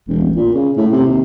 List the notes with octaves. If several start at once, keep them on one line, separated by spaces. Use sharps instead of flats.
E1
A1
A#2
C#3
A2
C3
D#2